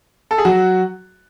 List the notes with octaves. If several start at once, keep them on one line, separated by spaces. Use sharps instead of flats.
A4
G#4
F#3 F#4